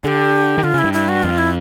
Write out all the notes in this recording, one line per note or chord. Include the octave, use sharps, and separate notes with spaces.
D3 G4 G#4
D#3
D3 F4
C#3 E4
G2
E4
F#4
F2 F4
E4